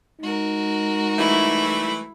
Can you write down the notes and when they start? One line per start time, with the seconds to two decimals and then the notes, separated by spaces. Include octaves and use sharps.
0.21 G#3 D#4 F#4 A#4
1.18 E3 G3 A3 E4